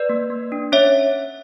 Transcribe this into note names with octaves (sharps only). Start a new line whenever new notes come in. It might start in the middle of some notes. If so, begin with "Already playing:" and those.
Already playing: B4 D5
A#3
A#3
D4
C#4 C#5 E5